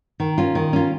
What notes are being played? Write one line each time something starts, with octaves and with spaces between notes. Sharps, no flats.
D#3
C#4 F4
D#3
C#4 F4